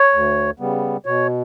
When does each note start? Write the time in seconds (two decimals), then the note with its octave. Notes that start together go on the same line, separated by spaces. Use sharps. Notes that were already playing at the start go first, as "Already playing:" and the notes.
Already playing: C#5
0.14 D2
0.59 C#3 G3 B3
1.06 B2 C#5